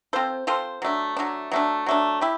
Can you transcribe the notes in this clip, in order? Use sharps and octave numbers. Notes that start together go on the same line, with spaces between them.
C4 F4 A4 C5
C4 F4 A4 C5
F#3 A3 D4
F#3 A3 D4
F#3 A3 D4
F#3 A3 D4
E4 G4